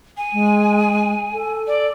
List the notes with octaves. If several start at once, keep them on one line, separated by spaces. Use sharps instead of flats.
G#5
G#3
A4
D5